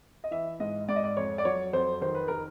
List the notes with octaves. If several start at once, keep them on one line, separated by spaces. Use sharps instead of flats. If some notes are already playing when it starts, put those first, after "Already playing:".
D#5
E3 E5
G#2 D#5
G#2 D5
D#5
D5
F2 C#5
D5
F#3 C#5
F2 C5
D#3 C5
B4
D#3 A#4